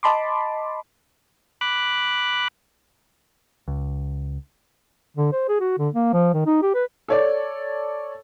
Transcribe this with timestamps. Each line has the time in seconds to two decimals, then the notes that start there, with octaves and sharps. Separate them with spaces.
0.03 D#5 A5 B5 C6 D6
1.61 B5 D6 F#6
3.68 C#2
5.16 D3
5.32 C5
5.48 G#4
5.60 F#4
5.78 D3
5.93 A#3
6.13 F3
6.33 D#3
6.46 D#4
6.62 G4
6.74 B4
7.08 A4 C#5 D5